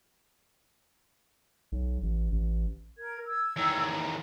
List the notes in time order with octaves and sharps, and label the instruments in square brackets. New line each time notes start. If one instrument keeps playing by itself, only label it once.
[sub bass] B1
A1
A1
[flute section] A#4 G#6
E6 G#6
[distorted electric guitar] E2 D#3